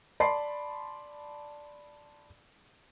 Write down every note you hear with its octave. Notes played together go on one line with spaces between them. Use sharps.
D5 A5 B5 C6 C7